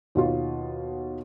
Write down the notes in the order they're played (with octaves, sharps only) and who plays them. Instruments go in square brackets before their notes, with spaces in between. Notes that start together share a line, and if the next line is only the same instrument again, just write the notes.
[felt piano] D#2 B2 F4